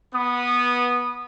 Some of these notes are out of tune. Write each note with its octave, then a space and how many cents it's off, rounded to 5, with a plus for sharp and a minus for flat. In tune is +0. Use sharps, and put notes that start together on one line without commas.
B3 -15 D#6 -20